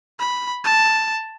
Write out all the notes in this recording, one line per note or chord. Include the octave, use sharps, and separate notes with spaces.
B5
A5